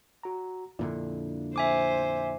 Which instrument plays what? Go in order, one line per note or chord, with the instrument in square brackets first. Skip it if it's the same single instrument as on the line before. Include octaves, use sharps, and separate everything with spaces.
[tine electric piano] F#4 A#5
[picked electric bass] F2 A#2 D3 [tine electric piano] D4 E4 D5
[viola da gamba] C5 [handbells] E5 G#5 D6